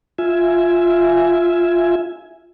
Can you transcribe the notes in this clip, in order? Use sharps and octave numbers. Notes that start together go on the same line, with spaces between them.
F4 E5 G#5